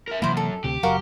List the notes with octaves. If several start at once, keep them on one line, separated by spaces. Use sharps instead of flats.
A#4 E5
F#2 C3 E3 A#3 E4 C5
A4
D2 C3 G4
F#1 F#3 F#4 A#4 F5